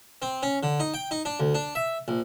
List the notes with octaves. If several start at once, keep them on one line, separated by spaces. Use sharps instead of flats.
C4
C#4
D3
D#4
G5
D#4
D4
D2
D4
E5
A#1